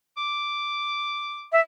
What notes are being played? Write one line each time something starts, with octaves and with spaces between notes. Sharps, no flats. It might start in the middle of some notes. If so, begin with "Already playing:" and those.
D6
E5